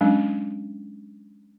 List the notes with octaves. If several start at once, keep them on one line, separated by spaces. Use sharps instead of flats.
F#3 G#3 C#4 D4